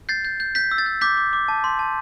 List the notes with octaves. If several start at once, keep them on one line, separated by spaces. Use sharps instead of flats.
G6 A6 C7
G6
G6
G6 B6
E6
A6
G6
D6 G6 B6
D6
D6
A5
C6
A5